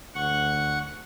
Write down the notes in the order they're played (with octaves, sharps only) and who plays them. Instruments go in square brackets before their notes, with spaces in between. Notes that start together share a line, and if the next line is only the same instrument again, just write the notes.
[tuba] D2 [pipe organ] F#5 C#6